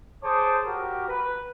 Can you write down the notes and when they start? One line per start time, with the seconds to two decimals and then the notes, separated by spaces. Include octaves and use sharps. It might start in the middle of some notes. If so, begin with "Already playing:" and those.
0.23 G#4 C5 C#5 A5 D6 D#6
0.65 F#4 G4 A#4
1.08 B4